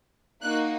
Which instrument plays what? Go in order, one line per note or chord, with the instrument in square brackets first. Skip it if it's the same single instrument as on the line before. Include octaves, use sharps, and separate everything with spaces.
[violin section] A#3 D#4 F#4 F#6